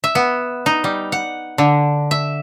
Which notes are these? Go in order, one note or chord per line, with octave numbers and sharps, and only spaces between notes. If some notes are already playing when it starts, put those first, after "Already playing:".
E5
B3
D#4
G3
F#5
D3
E5